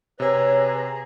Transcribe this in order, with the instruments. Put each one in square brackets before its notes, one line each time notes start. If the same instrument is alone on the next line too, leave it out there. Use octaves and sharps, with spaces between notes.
[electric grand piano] C3 E6 [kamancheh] G#4 A#5 [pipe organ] B4 [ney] C#5